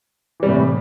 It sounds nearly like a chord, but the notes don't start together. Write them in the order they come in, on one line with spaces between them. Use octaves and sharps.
E3 G3 C3 A2